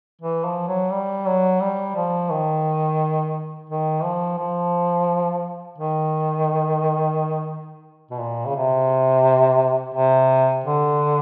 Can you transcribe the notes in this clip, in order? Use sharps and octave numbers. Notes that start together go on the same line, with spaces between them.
E3
F3
F#3
G3
F#3
G3
F3
D#3
D#3
F3
F3
D#3
B2
A#2
C#3
C3
C3
D3